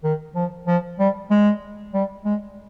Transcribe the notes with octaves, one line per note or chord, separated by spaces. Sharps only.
D#3
F3
F3
G3
G#3
G3
G#3